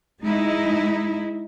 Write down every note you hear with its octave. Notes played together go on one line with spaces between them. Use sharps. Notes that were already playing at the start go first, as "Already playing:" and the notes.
G#3 D#4 E4